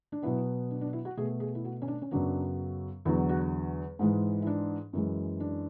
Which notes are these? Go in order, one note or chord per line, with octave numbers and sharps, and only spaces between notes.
D4
B2 F#3 B3 E4
D4
D4
E4
F#4
B2 A3 G#4
G#4
E4
F#4
C#4
D4
C#4
F#2 C#3 F#3 B3 D4
E2 D3 F#3 E4
F#4
G#2 E3 G#3
E4
D4
F#2 E3 G#3
D4